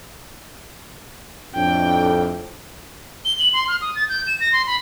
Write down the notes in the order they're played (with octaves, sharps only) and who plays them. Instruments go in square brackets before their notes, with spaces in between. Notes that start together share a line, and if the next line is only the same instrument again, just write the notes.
[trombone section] F2 A2 [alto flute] D4 [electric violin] G5
[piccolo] G7
F#7
C6
F6
D#6
A6
G6
E7
A#6
C6
B5